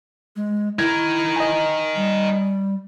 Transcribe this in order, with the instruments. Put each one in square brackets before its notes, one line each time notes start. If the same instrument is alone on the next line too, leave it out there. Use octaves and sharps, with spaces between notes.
[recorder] G#3
[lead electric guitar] D#4 A#4 [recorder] E4 [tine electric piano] G#6
[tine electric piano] D#5 G#5
[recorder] G3